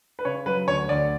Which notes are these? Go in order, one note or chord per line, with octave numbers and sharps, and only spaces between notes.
B4
C#3 C#5
F#3 B4
D2 C#5
D2 D5